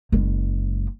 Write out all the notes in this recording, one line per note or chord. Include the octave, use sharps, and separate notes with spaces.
F#1 G#3